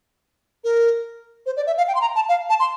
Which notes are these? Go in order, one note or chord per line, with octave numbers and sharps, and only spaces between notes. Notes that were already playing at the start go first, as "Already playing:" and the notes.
A#4
C5
D5
E5
F5
G5
C6
A#5
A5
F5
A5
C6